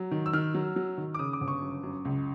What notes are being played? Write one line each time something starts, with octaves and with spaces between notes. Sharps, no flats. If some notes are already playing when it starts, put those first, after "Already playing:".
Already playing: F#3
D#3
E6
D#3 F6
F#3
F#3
D#3
D6
C#3 D#6
D6
G1
C#6
F#2
F#2
C#2